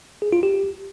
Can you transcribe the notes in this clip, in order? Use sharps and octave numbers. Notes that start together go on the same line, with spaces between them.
G#4
F4
G4